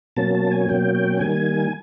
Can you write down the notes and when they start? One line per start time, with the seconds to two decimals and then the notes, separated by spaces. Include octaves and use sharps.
0.17 B2 F#3 A#3 C#4 A5
0.35 A5
0.51 G#5
0.69 B2 F#3 A#3 C#4 G5
0.95 G5
1.19 D#3 G3 A#3 G#5